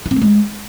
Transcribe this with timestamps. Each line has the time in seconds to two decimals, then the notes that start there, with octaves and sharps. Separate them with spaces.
0.06 E4
0.11 C4
0.16 A3
0.22 G#3